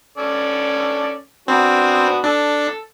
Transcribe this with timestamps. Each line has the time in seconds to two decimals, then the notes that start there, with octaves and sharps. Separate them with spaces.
0.18 C#4 A4 D5
1.48 B3 C4 D4 F#4
2.24 D4 A4